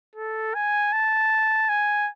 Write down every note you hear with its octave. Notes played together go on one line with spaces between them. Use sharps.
A4
G#5
A5
G#5